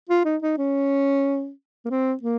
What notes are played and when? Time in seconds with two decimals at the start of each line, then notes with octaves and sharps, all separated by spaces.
0.09 F4
0.25 D#4
0.42 D#4
0.58 C#4
1.86 A#3
1.90 C4
2.23 A#3